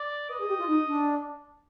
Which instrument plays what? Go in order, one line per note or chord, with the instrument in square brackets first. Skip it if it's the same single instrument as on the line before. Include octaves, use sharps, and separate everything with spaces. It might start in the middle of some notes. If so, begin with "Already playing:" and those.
Already playing: [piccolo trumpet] D5
[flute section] B4 [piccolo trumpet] D#5
[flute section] G#4
G4
F4
D#4
D4